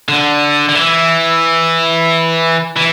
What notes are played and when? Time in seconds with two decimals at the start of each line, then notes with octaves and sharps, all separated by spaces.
0.09 D3
0.69 D3
0.75 E3
2.76 E3